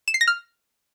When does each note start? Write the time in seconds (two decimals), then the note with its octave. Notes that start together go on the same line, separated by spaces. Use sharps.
0.08 E7
0.14 C7
0.21 A#6
0.27 F6